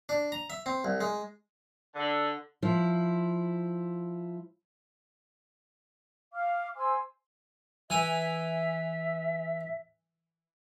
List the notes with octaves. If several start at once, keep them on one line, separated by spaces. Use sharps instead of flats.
D4
A#5
E5
C4
C2
G#3
D3
F3 E4
F5 D6 F6
C5 G#5 C6 E6
E3 E5 G#5